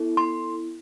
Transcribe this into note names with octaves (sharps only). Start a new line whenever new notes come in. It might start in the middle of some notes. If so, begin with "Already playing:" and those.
Already playing: B3 E4 A4
C6